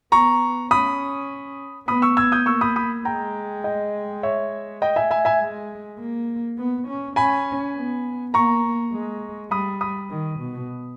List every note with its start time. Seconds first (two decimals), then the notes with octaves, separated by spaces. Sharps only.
0.12 B3 A#5 C#6
0.70 C#4 B5 D#6
1.87 B3 B5 D#6
2.02 C#6 E6
2.17 E6 G#6
2.32 D#6 G6
2.46 A#3 C#6 E6
2.61 B5 D#6
2.76 B5 D#6
3.05 G#3 G5 A#5
3.64 D#5 G5
4.23 C#5 E5
4.82 D#5 G5
4.96 E5 G#5
5.11 E5 G#5
5.25 E5 G#5
5.41 G#3
5.99 A#3
6.58 B3
6.87 C#4
7.16 C#4 G#5 B5
7.76 B3
8.34 A#3 A#5 C#6
8.93 G#3
9.51 G3 B5 D#6
9.81 B5 D#6
10.10 D#3
10.39 B2